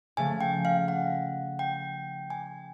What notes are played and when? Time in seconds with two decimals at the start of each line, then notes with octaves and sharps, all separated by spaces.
0.17 C#3 F3 A3 G#5
0.41 G5
0.65 F5
0.88 F#5
1.59 G5
2.30 G#5